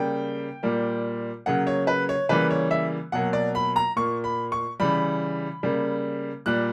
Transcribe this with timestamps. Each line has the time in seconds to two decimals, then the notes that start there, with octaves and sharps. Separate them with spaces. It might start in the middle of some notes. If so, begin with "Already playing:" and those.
Already playing: C#3 G3 A#3 G5
0.63 A#2 G3 A#3
1.46 C#3 F#3 A#3 F#5
1.67 C#5
1.87 B4
2.09 C#5
2.29 C#3 E3 G3 A#3 B4
2.50 C#5
2.71 E5
3.12 B2 F#3 A#3 F#5
3.33 D5
3.55 B5
3.76 A#5
3.96 A#2 A#3 C#6
4.24 B5
4.52 C#6
4.80 C#3 E3 G3 B5
5.63 C#3 G3 A#3
6.46 A#2 G3 A#3 F#6